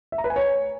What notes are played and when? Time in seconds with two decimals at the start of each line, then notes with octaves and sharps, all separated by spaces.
0.12 E5
0.18 A#5
0.24 B4
0.30 G#5
0.36 C#5